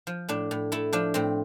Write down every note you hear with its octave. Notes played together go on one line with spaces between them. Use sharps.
F3
A2 D4
A2
A3 E4
F3 D4
A2 C4